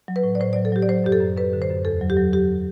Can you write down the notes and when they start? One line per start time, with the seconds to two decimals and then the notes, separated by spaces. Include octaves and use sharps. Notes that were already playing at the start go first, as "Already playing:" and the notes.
0.08 F#3
0.16 B4
0.23 A2
0.35 D5
0.40 A2 C5
0.53 F#3 D5
0.65 A4
0.72 F#3 G4
0.82 D5
0.89 F#3 C5
1.04 F#2 G4
1.12 A4
1.20 F#2
1.37 F#2 B4
1.53 D3
1.62 C5
1.70 F#2
1.85 E2 A4
2.01 F#3
2.10 G4
2.17 F#3
2.33 F#3 G4